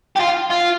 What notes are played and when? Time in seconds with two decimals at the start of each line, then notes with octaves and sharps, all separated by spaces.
0.17 G4
0.21 F4
0.51 F4